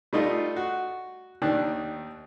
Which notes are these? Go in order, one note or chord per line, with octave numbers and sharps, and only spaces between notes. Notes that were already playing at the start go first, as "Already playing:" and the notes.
G3 A3 D#4 F4 D#5
F#4
D#2 D#3 D4 F#6